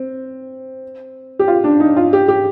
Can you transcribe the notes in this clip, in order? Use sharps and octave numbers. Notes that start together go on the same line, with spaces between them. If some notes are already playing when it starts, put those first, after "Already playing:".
Already playing: C4
G4
F4
D4
D#4
F4
G4
G4